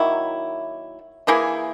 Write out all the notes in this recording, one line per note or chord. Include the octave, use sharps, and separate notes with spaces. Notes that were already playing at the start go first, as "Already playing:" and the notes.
Already playing: D#3 F#3 A#3 E4
E3 A#3 E4 G#4